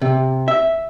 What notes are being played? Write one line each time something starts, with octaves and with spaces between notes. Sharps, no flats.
C3
E5